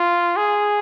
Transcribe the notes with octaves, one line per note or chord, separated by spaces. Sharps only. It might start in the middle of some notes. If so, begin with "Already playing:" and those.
Already playing: F4
G#4